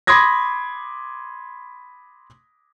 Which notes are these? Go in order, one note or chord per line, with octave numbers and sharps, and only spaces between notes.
B5 C6 D6 D#6 G#6 A#6